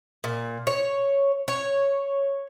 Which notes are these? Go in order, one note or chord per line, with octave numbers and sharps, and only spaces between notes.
A#2
C#5
C#5